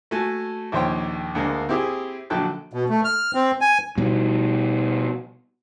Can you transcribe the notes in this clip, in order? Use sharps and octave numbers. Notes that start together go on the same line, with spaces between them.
A3 F#4 G#5 A5
A#1 D#2 C5 C#5 G5
D2 D3 G#3 A#3
C4 E4 G4 G#4
A#1 D3 F#3 G5 A5 F#6
B2
A3
F6
C4
G#5
B2 G3